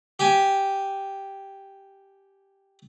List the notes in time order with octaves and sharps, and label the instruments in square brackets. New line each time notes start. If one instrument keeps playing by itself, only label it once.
[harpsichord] G4 G#5